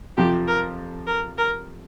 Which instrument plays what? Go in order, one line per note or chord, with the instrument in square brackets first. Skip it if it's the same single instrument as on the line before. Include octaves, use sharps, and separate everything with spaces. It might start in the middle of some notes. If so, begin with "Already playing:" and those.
[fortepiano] F2 C3 F3 [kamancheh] G4
[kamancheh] A#4
A#4
A#4